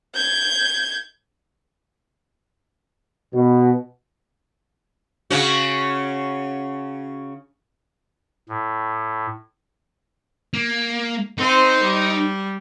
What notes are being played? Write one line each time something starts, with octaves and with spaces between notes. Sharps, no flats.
G6 G#6
B2
C#3 C#4 F#4
A2
A#3
C4 D#4 C5
G3